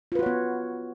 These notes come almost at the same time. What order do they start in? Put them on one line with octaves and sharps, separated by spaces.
F4 B4 F#4 C#5 B3